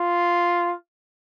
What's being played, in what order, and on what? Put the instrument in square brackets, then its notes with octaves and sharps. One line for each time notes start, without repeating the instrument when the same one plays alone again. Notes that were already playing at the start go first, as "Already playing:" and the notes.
Already playing: [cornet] F4